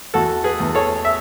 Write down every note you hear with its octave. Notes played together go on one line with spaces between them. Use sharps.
E2 F#4 A4
G#4 B4
E2
A4 C#5
E5